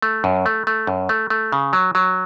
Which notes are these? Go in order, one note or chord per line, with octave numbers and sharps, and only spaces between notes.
A3
F#2
A3
A3
F#2
A3
A3
C#3
F#3
F#3